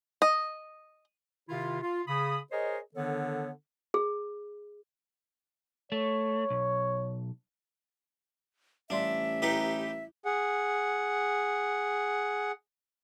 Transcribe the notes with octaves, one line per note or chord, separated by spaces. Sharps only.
D#5
C3 D#3 E4 F4
F4
C#3 B5 D#6
G#4 A#4 C5 C#5 D#5
D3 D#3 B3 D4 A4 C#5
G#4
A3 C#5
B1
A1 G3 D4 D5 E5 C6
D#4 E4 G4 B4
G#4 F#5